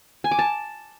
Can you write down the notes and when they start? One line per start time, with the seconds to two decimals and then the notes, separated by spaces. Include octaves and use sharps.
0.24 G#5
0.31 D6
0.39 A5